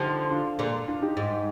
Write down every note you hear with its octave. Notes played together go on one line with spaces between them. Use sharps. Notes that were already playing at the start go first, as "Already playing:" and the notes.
Already playing: D3 F3 D#4 G4
D4 F4
A#2 D3
D4 F4
D#4 G4
G#2